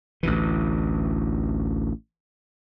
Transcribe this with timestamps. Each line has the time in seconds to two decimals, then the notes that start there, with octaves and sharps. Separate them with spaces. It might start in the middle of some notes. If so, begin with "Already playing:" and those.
0.23 A1 D2 E3